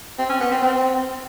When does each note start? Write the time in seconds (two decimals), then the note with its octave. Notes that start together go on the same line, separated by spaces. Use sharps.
0.18 C4
0.29 C#4
0.40 B3
0.51 C4
0.62 C4